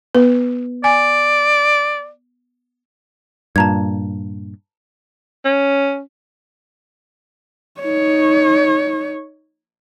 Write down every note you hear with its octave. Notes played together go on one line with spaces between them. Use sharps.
B3 B4
D5 G#5
G2 A#2 A5 A#5 G#6
C#4
D#4 C#5